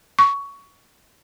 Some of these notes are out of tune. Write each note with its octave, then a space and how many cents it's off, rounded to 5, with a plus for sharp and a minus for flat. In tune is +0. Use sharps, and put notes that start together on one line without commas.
C#6 +15